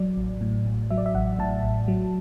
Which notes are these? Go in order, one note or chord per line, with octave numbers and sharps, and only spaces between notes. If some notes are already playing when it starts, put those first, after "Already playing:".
Already playing: F#3 D5
A1
A2
A1
F#3 E5
D5
E5
A1 F#5
A2 A5
A1
F#3